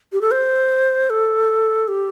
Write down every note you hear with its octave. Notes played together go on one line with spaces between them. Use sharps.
G4
A4
C5
A4
G4